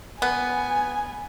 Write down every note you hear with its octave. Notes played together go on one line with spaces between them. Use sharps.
B3 G#5